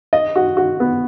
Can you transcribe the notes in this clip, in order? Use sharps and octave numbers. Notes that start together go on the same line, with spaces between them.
D#5
F#4
F#4
B3